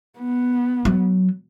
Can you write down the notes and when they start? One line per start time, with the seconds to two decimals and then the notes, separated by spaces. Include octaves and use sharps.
0.19 B3
0.85 F#3